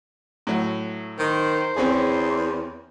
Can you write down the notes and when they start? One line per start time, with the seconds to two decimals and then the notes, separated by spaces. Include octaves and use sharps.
0.47 A2 F#3
1.19 D#3 C5
1.76 E2 C4 C#4 G#4